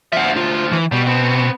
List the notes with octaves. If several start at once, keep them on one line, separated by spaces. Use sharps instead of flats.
D2 F3 E5 F#5
F4
E3
B2 G3
B3 C4